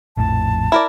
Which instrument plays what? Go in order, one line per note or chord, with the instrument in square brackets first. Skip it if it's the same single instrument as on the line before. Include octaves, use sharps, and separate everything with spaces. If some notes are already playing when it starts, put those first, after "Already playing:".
[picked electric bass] A#1 F2 A2 [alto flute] A5
[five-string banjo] E4 A#4 D5